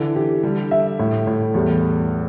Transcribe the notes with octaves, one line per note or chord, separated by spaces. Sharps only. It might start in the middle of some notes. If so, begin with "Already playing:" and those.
Already playing: D3 E3
G4
D3 G3
E5
A2
A2
E2 G3